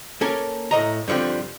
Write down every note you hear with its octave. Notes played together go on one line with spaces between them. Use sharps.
A#3 C#4 A4 A#4
A2 D#5 A#5
G2 D3 F3 G3 C4